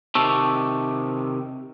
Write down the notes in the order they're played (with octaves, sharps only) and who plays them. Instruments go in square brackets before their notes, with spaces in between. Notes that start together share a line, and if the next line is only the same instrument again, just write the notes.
[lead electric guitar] C3 D#3 [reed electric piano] A5 C#6 E6